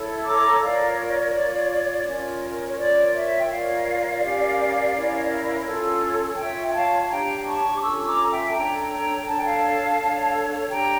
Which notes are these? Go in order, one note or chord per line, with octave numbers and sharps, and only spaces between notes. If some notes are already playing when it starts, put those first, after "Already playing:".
Already playing: E4 A4 C#5
A#5 D6
F4 A#4 C#5 D5 F5
D5
F4 C#5
C#4 F4 A#4 C#5
C#5
F4 A#4 C#5 D5
C#5 E5
G5
F4 A#4 C#5 D5 F5
C#4 G4 A#4
C#4 E4 A#4 C#5
C#4 F4 A4 C#5
F4 C#5 E5 G5
G5
F5 A5
D4 G4 C#5 G5 A#5
A5 C#6
D6
C#4 F4 A4 C#5 C#6 E6
A#5 D6
E5 G5
A5
D4 A4 C#5 G5 A#5
G5 A#5
D4 A4 C#5 A5
G5
F5 A5
D4 A4 C#5
D4 G4 C#5 G5 A#5